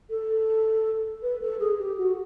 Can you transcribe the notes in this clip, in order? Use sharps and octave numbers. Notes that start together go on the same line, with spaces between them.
A4
B4
A4
G#4
G4
F#4